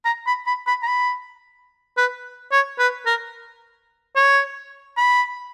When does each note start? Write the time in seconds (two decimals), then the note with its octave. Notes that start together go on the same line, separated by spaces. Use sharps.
0.05 A#5
0.26 B5
0.47 B5
0.67 B5
0.83 A#5
0.87 B5
1.97 B4
2.52 C#5
2.79 B4
3.06 A#4
4.16 C#5
4.97 B5